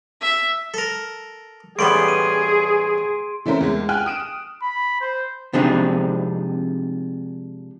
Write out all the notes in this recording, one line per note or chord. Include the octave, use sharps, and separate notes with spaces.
E5
A4 A#4
A1 G3 B3 G#4 C6 D7
D#7
E3 A3 C4 C#4 A#4 C5
E2 G#3
G5 G#5 F6 F#6
D#6 D7 E7
B5
C5
C3 F3 G#3 C4 D4 D#4